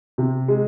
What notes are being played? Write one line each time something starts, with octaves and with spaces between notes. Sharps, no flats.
C3
G#3